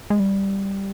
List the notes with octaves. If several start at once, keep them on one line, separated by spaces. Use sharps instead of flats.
G#3
G3